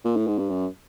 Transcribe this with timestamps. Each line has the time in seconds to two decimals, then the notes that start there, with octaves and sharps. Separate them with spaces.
0.05 A#2
0.16 A2
0.27 G#2
0.38 G2
0.50 F#2